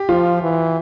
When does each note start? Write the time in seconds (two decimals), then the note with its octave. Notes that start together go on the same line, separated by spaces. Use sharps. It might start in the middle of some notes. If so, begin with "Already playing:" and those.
Already playing: G4
0.09 F3 F4
0.42 E3